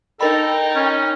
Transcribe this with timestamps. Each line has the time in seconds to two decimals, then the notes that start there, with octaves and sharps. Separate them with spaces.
0.21 D#4 A4 A#4 G5 B5
0.76 C#4